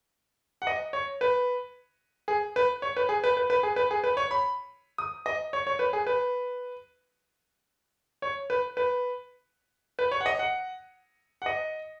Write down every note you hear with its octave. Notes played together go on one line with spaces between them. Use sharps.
F#5
D#5
C#5
B4
G#4
B4
C#5
B4
G#4
B4
B4
B4
G#4
B4
G#4
B4
C#5
B5
D#6
D#5
C#5
C#5
B4
G#4
B4
C#5
B4
B4
B4
C#5
F#5
D#5
F#5
F#5
D#5